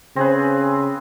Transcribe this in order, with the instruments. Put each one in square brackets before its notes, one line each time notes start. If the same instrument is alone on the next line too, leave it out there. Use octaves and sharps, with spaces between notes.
[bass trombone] C#3 [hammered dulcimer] C4 G#4 B4